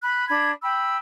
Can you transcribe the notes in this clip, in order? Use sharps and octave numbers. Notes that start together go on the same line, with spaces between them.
B5 F#6
D4 B5 G#6
G5 B5 E6